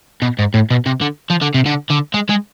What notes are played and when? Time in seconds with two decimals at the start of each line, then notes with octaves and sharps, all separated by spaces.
0.22 B2
0.39 G#2
0.54 A2
0.71 B2
0.86 C3
1.02 D3
1.30 F3
1.42 D3
1.54 C3
1.66 D3
1.90 D3
2.14 G#3
2.30 G#3